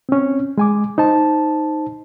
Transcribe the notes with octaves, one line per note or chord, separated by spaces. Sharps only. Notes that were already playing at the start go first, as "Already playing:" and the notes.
C4 C#4
G#3 G#5 D6
D#4 C5 A5